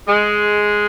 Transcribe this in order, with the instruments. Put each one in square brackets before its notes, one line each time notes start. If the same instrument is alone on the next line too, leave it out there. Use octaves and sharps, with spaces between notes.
[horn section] G#3